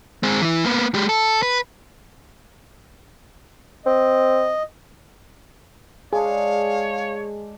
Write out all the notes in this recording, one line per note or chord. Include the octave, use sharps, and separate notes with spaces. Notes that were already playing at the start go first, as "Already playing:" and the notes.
G#3 C4
E3 E4
A#3 B3
G#3 G4
A4
B4
C4 D#5
G#3 D4 G#4 C#5 F5